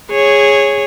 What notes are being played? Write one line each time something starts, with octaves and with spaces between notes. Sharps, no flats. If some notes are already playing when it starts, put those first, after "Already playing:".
G#4 C#5